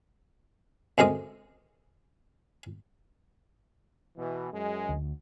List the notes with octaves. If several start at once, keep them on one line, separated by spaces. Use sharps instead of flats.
D2 G#3 C4 A#4 D#6
B2 E3
F#2 G#3
D2